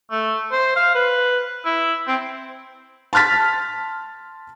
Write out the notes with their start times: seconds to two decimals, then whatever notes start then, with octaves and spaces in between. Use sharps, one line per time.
0.11 A3
0.52 C5
0.76 F5
0.95 B4
1.65 E4
2.07 C4
3.13 A5 C6 F6 A6 B6